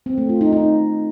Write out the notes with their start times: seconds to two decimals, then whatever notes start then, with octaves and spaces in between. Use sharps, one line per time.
0.06 C4
0.18 A3
0.29 F4
0.41 D#4
0.52 D#4